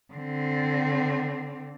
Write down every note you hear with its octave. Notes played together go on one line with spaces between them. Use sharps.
D3 C4